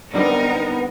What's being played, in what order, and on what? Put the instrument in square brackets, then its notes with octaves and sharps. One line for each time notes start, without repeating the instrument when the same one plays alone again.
[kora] D3 G3 C4 [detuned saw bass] B3 [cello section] D#4 A#4